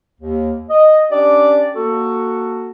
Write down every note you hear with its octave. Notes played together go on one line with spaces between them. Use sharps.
D#2
D#5
C#4 D4 G4 D5
A#3 F#4 A4